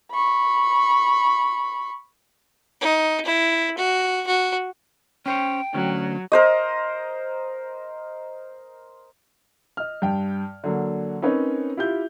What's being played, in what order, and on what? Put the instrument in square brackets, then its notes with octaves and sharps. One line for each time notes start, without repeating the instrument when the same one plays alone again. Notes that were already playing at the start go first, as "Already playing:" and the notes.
[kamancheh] B5 C#6
[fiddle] D#4
E4
F#4
F#4
[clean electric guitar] C#4 C5 C#5 [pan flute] G5
[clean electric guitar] D2 C#4 [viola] F#3
[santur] A#4 C5 D#5
[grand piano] D#5 F6
G2 G5
D3 F#3 A#3
C4 C#4 D#4 A#4 B4 C#5
E4 F4 G4 G6